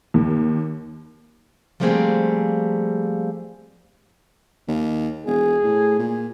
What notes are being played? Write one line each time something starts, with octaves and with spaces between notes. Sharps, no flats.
D#2
F3 G3 A3 A#3 C4 G#4
D#2
E1 G#4
A2
A#2